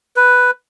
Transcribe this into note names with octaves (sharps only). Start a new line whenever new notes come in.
B4